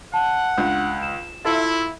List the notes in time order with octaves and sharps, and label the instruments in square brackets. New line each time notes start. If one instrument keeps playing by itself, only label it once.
[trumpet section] F#5 [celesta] A5
[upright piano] C#2 [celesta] D4
[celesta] E7
[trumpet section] E4 [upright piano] F4 A4 E5